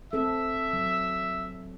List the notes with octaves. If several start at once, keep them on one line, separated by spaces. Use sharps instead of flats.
C4 A4 E5
F#3